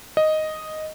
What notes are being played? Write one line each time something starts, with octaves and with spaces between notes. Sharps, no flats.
D#5